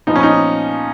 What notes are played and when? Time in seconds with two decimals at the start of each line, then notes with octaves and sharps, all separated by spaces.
0.07 A#2 F3 B3 D#4
0.16 C#4
0.23 D#4